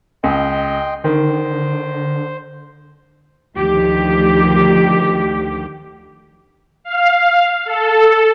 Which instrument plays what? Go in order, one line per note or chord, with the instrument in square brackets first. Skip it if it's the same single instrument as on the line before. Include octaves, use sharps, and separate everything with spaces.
[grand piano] C#2 [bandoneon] D#5 G5 C6
[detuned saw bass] D3 [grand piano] D#3 [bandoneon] C5
[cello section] D2 D#3 F3 G4
[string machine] F5
A4